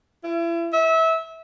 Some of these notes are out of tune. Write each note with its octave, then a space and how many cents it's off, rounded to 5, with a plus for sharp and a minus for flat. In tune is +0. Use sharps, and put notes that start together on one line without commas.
E4 +35
E5 -25